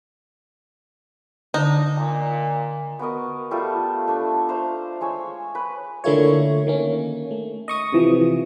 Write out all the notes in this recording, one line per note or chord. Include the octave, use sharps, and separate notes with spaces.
D3 D4 D#4
A#2
B3 F#4 A#4 D#5
G3 A3 F4 A4
A3 D4
A3 C5 F5 A#5
G#3 C#5 G#5 E6
B4
D3 A3 A#3 E4 F4 C#5
D#3 A#3 C#4
A3
D#5 C#6 D#6
C3 E3 F3